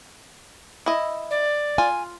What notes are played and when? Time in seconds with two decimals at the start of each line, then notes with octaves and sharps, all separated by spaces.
0.86 E4 D#5
1.31 D5
1.78 F4 G#5